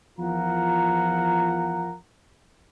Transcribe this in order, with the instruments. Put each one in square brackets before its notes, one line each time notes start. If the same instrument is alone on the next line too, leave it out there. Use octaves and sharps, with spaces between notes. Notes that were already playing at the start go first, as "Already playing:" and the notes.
[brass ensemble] E2 F3 F4 A#4 F#5 A#5